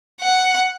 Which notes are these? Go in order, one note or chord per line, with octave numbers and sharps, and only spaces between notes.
F#5